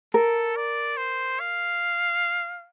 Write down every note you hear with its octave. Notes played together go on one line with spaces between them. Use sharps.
A4 A#4
D5
C5
F5